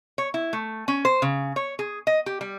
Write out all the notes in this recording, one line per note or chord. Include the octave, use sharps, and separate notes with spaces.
C#5
E4
A3
C#4
C5
C#3
C#5
G#4
D#5
G4
G3